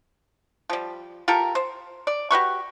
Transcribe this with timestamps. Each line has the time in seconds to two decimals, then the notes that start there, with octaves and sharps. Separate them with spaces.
0.70 F3 G3
1.28 F4 G4 A4 A#4
1.55 C5
2.07 D5
2.31 F#4 G4 B4 C#6